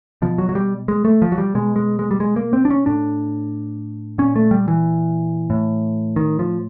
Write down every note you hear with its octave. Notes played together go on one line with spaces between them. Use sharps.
B2 F3
F#3
F#3
G3
G#3
A3
F3
F#3
G3
B2 G#3
G#3
G#3
G3
G#3
A#3
C4
D4
C#4
A2 D4
A#2 C#4
A3
G3
E3
A2
D#3
F3